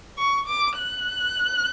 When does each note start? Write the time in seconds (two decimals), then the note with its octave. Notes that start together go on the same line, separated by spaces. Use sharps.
0.18 C#6
0.48 D6
0.78 F#6